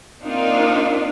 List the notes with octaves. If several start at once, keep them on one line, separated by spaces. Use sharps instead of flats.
A#3 C4 D4 D#4 F4 A#4